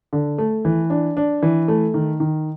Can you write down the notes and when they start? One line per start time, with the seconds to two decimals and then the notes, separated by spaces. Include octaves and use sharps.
0.13 D3
0.38 A3
0.65 E3
0.90 D4
1.17 D4
1.43 E3
1.68 A3
1.94 D#3
2.20 D#3